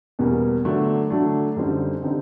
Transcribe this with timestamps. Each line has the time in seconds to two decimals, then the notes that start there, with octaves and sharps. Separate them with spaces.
0.19 E2 B2 G3 A#3
0.65 D3 F#3 A3 D4
1.10 D3 F#3 A3 D4
1.56 F#2 D3 G3 C4 D#4
2.03 D3 G3 C4 D#4